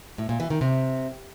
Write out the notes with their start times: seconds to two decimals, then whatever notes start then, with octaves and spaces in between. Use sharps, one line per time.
0.18 A2
0.29 A#2
0.40 E3
0.50 D#3
0.61 C3